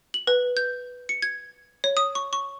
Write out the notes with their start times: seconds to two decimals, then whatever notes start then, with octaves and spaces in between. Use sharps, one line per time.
0.14 F#7
0.27 B4
0.57 G6
1.09 C#7
1.22 G#6
1.84 C#5
1.97 D#6
2.15 C#6
2.33 C#6